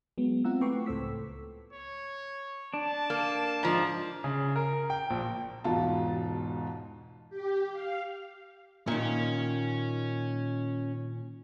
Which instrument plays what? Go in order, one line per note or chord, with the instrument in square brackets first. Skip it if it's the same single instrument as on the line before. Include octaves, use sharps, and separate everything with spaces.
[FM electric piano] F#3 G#3 B3
C4 E4 F4 F#5 A#5 E6
A3 B4 G5 C#6 D6 C7
C#2 A2 A4 C5 E6 B6
[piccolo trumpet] C#5
[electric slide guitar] D4 [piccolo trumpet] A5
[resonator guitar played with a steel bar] A#3
G#2 F3
[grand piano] C#3
A#4
G5
A#1
[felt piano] E1 G#2 B2 F4 A5
[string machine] G4
F5
[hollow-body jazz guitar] A#2 D#3 [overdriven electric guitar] C#4